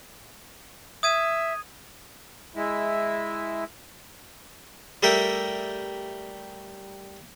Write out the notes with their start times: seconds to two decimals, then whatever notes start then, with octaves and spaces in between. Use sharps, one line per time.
1.03 E5 D#6 G#6 D#7
2.56 G#3 E4
5.03 G3 A3 A4 A#4 E5 G5